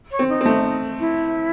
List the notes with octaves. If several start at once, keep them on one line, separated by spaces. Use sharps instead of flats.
C#5
C4
D#4
C4
A3
E4